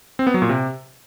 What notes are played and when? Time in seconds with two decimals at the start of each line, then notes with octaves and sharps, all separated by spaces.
0.19 C4
0.27 B3
0.34 F#3
0.42 A#2
0.49 C3